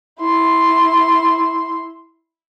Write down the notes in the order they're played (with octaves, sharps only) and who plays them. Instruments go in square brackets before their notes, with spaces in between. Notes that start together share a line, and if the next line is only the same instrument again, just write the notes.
[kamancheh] E4 C6